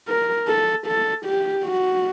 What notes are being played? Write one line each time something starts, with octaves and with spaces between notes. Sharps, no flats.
A#4
A4
A4
G4
F#4